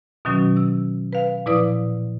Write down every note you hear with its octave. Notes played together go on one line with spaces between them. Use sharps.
B2 D#3 F#3 C#4 F#4
E6
B4 F5
A#2 F3 E4 B4 D5 D#6